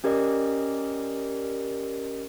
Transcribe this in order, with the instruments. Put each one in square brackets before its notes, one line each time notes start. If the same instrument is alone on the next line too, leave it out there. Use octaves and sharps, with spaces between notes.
[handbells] C#4 G4 A#4 D5 D#5